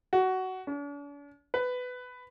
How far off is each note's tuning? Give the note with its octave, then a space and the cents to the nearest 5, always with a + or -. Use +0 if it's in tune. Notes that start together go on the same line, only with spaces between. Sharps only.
F#4 +15
D4 -45
B4 +15